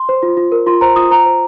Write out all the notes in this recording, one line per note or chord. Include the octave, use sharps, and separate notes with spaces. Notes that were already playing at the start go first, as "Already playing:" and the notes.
Already playing: C6
C5
F4
F4
A#4
F4 C6
C5 A#5
F4 D#6
C5 A#5
C5